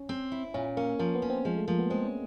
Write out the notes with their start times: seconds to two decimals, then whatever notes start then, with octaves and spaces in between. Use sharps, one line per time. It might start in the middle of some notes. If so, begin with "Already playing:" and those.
Already playing: C#4
0.09 C4
0.32 E4
0.54 A#2 C#4
0.77 A#3 C#4
0.99 F3 A#3
1.15 B3
1.22 C#4
1.30 C4
1.45 F3 G#3
1.56 A3
1.68 F3 A#3
1.79 B3
1.90 G#3 C4
2.05 C#4